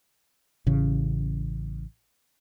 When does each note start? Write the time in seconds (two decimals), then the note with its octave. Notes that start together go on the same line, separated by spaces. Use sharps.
0.66 A1 C#3